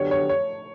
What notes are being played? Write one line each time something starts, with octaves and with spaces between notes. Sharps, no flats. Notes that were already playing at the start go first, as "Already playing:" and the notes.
Already playing: D3 F#3 B3 D4 G4 C#5
C#5
C#5